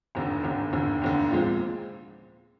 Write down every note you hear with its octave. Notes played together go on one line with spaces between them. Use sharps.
F1 D#2 D3
F1 D#2 D3
F1 D#2 D3
F1 D#2 D3
A#2 F3 G#3 C4